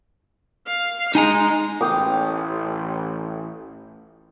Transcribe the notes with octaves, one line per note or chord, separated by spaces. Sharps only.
F5
G#3 D#4 G#5 A#5
A1 G5 D6 D#6